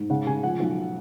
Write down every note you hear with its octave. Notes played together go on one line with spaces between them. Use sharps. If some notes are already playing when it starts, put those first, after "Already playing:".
Already playing: G#2
C#3 F#5
C#3 G#5
F3 F#5
B1